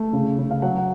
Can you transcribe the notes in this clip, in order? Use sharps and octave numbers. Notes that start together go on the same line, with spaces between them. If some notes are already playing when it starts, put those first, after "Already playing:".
Already playing: A3
C#3
C#3
F5
F#3 F#5
F#5